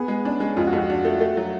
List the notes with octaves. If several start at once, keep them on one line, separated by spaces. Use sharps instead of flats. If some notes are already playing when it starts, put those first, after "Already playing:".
Already playing: B3 G#4
G#3
C#4 D4
G#3 C#4
F2 F4
F#4
F2
F#4
D4
A3
A3
F#3